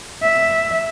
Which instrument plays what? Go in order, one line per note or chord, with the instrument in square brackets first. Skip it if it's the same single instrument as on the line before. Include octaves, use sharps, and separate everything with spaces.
[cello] E5